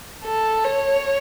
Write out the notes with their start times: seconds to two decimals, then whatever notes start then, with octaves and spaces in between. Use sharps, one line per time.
0.25 A4
0.64 C#5